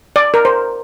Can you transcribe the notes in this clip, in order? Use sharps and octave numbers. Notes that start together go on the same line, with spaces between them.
D5
A#4
C5